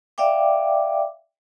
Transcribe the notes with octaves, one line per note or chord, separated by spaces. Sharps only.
D5 E5 F5 G5 D6